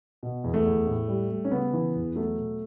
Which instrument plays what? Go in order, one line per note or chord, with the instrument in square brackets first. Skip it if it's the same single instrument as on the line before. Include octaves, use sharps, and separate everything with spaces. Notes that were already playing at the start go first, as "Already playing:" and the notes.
[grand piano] B2
E2
A3
E2
A2
G3
G3
C#4
C#3 B3
E3
E2
F#3 A3
B2